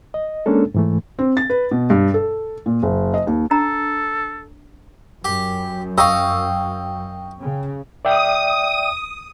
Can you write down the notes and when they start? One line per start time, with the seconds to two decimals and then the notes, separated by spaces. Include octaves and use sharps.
0.14 D#5
0.46 G#3 A#3 C#4 D4 A4
0.74 G#2 E3 A3
1.19 C4
1.37 A6
1.50 B4
1.71 B2
1.90 G2
2.14 A4
2.66 A#2
2.83 F#1
3.14 D#5
3.27 D#2
3.51 D4 A4 A#5
5.25 F#2 G4
5.98 D#5 F5 G5 C#6 E6
7.39 C#3
8.05 D5 E5 G5 D#6